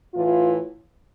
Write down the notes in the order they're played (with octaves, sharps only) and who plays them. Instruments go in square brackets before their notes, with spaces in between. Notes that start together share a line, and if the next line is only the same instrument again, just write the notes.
[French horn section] A2 E3 F4